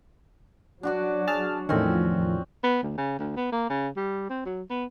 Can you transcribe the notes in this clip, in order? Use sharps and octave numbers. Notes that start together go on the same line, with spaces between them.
F#3 D4 F#4 D5
G#4 A5 F6
E2 A2 D#3 F3 C4 C#4
B3
D2
C#3
D2
B3
A#3
C#3
G3
C4
F#3
B3